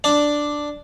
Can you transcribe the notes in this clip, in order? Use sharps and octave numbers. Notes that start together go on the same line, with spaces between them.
D4